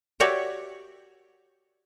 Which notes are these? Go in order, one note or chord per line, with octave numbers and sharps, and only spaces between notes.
F#4 G4 C#5 D5 E5